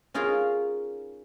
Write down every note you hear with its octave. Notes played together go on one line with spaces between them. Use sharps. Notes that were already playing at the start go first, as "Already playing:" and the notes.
C#4 D#4 F4 G#4 A#4